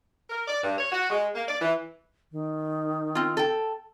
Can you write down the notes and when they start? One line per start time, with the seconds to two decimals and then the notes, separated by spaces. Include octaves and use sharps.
0.30 A#4
0.48 D5
0.63 G2
0.78 C#5
0.92 F#4
1.10 G#3
1.35 A#3
1.48 D5
1.60 E3
2.32 D#3
3.15 C4 F4
3.37 A4 G5